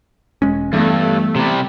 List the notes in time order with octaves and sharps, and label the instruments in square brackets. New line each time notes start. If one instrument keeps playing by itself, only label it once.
[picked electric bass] E1 G#3 C#4
[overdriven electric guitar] G2 [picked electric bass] E3 B3 [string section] A3
[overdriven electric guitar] C3 G3